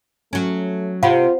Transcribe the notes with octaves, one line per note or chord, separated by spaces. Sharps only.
F#3 A3 C#4
C3 F4 F5 F#5 B5